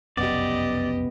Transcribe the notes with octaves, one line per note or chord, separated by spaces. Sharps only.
F1 B1 F#2 B3 G4 D5 D#5